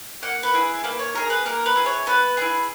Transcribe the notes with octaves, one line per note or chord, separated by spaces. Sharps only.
A#3 F#5
B4
E4 G#4
A#3 B4
C#5
E4 G#4 A#4
B4
A#3 A#4
B4
E4 G#4
C#5
B3 B4
E4 G#4